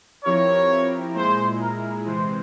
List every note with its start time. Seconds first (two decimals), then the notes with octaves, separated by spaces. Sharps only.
0.24 F3 C4 E4 G4 A#4 C#5
1.15 A#2 G#3 E4 G#4 C5
1.61 A#4
2.06 C3 E3 G#3 C5